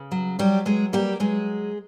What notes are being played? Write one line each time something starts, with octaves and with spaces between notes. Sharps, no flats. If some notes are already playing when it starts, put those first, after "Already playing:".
Already playing: C#3
F#3
F#3 G3 G4
F#3 G#3 G#4
G3 A#3 G4
F#3 G#3 G#4